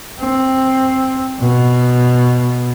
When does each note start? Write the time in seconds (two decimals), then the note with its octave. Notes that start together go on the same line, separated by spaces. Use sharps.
0.20 C4
1.40 B2